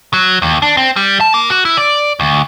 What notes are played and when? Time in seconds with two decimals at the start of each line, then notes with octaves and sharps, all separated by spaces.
0.13 F#3
0.42 D#2
0.62 D4
0.77 C4
0.96 G3
1.21 A5
1.34 A#3
1.50 F#4
1.65 E4
1.77 D5
2.20 D2